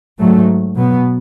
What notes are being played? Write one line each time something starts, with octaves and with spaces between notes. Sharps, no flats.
G#2 F#3 A3
B2 F#3 B3